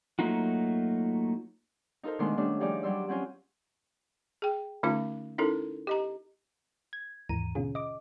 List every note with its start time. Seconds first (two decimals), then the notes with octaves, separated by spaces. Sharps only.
0.19 F#3 A3 A#3 D#4 F4 F#4
2.03 D#4 F4 A4 A#4 C5
2.19 B2 D#3 G#3 A3 D4 C6
2.37 D#3 G3 A3 C#4 D4
2.60 F3 G3 D#4 G#4 D5
2.83 F#3 G3 D5 C6 E6
3.08 F#3 C4 C#4 F4
4.42 G#4 G5
4.83 D3 A3 C#4 D#4 F4 D6
5.38 C#4 D#4 E4 A4 A#4
5.87 G4 D#5 A#5
6.93 G#6
7.29 D#2 G#2 E3 A#5 D#7
7.55 B2 D3 C#4 F4 G#4
7.75 D#5 D6